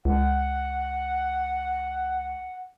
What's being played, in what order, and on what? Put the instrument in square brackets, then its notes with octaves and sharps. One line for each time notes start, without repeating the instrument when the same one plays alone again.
[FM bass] C#2 [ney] F#5